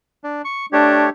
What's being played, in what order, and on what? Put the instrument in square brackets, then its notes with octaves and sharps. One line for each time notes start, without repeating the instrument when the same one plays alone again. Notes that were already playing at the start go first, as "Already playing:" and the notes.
[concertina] D4
C#6
[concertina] A3 G4 C#5 [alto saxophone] D4